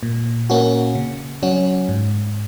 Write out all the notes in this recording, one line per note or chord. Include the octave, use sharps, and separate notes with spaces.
A#2
A#3 C#4 F#4
C#3
F#3 C#4 F#4
G#2